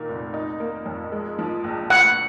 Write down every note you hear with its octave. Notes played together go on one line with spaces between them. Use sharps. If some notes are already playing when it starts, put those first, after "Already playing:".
Already playing: A#2 D#3 A#3
F1
D#4
A#3
F2
G#3
F3
A#1
D2 F#5